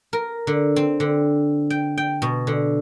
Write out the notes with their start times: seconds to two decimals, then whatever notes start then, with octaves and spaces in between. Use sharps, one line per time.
0.13 A#4
0.47 D3
0.76 C4
1.00 D3
1.70 G5
1.98 G5
2.22 B2
2.47 D3